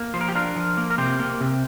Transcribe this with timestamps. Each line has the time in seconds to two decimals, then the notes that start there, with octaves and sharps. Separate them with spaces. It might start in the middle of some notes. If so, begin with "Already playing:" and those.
Already playing: A#3
0.14 F3 C5
0.21 A#4
0.28 G4
0.35 D4 F4 A#4
0.56 F3
0.77 A#3
0.90 A#4
0.98 C3 G4 C5
1.19 A#3
1.41 C3